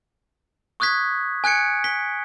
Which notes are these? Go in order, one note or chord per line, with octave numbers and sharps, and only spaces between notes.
C#6 D#6 F#6 G#6 B6
G#5 F#6 G#6 C#7 D7
B6 G7